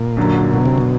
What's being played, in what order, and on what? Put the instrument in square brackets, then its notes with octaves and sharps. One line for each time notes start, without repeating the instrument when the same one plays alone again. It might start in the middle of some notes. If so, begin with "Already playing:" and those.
Already playing: [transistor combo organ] A#2
[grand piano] F#2 D3 F#3
[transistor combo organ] B2
C3
B2